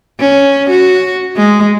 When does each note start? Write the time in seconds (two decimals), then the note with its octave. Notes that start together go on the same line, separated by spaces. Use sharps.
0.20 C#4
0.70 F#4
1.36 G#3